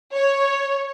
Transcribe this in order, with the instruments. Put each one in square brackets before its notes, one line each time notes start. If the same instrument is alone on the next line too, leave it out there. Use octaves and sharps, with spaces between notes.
[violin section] C#5